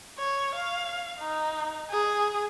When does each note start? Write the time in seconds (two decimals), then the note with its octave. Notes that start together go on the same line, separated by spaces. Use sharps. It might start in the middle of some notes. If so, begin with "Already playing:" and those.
0.19 C#5
0.55 F5
1.20 D#4
1.91 G#4